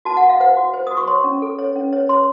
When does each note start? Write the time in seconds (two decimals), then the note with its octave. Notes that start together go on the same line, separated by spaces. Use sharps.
0.05 F#4 A5
0.17 F#5
0.22 F#4
0.29 F5
0.40 C5 F#5
0.57 F#4
0.74 C5
0.87 F#4 D#6
0.97 C#6
1.07 C#5 C6
1.24 C#4
1.42 A4
1.59 C#5
1.76 C#4
1.93 C#5
2.09 C#5 C6